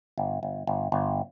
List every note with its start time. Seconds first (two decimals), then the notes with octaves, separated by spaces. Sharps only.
0.18 G1
0.43 G1
0.67 G1
0.92 G1